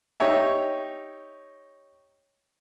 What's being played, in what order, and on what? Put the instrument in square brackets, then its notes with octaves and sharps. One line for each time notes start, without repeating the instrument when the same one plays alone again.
[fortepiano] D#4 G4 C#5 E5